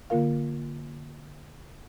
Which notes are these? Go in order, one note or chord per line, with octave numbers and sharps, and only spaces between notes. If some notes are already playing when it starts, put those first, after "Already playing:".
D3 A#3 F4 A#4 F5